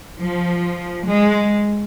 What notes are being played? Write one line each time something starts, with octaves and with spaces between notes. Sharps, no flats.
F3
G#3